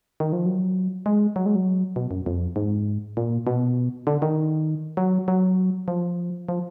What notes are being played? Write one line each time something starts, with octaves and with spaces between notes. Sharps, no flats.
D#3
F3
F#3
G#3
F#3
G#3
F#3
B2
F#2
F2
G#2
A#2
B2
D3
D#3
F#3
F#3
F3
F3